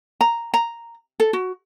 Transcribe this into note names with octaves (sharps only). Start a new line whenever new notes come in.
A#5
A#5
A4
F#4